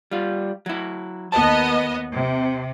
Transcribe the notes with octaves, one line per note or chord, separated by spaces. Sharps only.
G3 F4
F#3 E4
D#2 B3 D#5 A5
C3